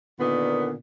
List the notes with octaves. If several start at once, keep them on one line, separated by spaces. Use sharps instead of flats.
A#2 D3 D#3 B3